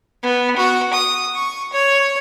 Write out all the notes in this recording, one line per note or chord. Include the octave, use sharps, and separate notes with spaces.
B3
F#4
D#6
C#6
C#5